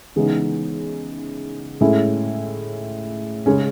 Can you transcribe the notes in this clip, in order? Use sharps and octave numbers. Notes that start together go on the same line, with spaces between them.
C#3 E3 G#3 B3 D#4
A2 G#3 C#4 E4
C#3 G#3 C#4